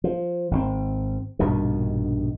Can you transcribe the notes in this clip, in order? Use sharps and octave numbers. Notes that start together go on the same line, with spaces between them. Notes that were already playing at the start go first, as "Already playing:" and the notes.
F3
G#1 C3 C4
A#1 G2 B2 D#3